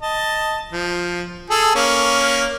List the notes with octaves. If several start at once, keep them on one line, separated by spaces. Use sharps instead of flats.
D#5 A5
F3
G#4 A4
A#3 C#4